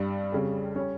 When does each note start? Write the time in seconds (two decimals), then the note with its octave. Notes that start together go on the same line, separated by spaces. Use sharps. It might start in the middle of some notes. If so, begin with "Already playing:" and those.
Already playing: G2 G3
0.32 F2 C#3 G3
0.75 G3 C#4 C#5